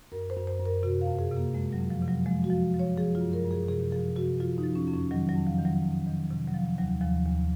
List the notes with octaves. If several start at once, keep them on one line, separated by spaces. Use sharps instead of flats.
F#2 A#4
C5
F#2
C5
F#2
A#4
C3 F#4
F5
F2
G#4
C3
A#3
F2 G#3
F#3
F2
F3
C3
F#3
F3 G#3
F#4
F3
F3
C#5
F3 G#4
F4
F#2
A#4
F#2
G#4
C3 G#4
F3 G#4
C3 F#4
F3 F4
D#4
F3
C#4
F2
C#4
D#3 F#3
F#3
F2
F3
D#3
F#3
F2
D#3
C3
F#3
F3
D#2 F#3
D#2 F3
D#2